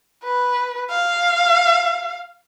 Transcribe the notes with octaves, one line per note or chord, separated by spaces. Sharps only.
B4
F5